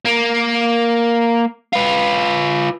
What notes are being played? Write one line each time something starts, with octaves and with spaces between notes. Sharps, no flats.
A#3
F4 B4